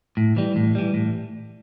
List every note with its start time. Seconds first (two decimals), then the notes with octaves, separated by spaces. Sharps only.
0.17 A2
0.37 E3 G3
0.56 A2
0.75 E3 G3
0.94 A2